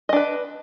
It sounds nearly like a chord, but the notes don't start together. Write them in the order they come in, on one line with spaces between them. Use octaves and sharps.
D#5 D4 B4